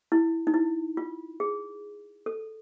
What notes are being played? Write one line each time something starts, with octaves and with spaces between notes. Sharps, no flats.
E4
D#4
E4
F4
G#4
A4